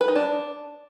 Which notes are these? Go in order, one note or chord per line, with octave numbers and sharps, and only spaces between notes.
B4
D#4
D4